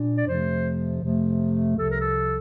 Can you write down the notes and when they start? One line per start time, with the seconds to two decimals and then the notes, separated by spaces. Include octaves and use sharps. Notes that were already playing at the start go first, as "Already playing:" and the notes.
Already playing: A#2 D4
0.17 D5
0.26 F2 C3 F3 A3 C5
1.01 F2 C3 F3 A3
1.77 C2 C3 F3 A4
1.88 A#4
2.01 A4